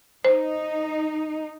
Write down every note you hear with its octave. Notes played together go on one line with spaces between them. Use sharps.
D#4 C5